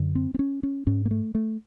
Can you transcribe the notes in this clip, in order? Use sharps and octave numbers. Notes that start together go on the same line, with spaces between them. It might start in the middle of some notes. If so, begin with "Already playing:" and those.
Already playing: F#2 D3
C4
C4
C#4
C#4
G#2 C#4
A#3
A3
A3